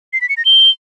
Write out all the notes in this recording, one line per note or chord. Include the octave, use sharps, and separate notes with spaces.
C7
B6
C#7
A#6
G7